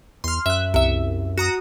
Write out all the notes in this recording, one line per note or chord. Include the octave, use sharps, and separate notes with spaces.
E2 C6 F6
F#2 E5 F#6
C2 E5
F#4 A#5 D#6